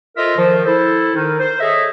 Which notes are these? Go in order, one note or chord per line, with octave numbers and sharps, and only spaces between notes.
F4 A4 A#4 C5 D#5 E5
D#3 F3
E4 A4 C5
D#3 D#4
C5
G#4 A4 C#5 D#5 E5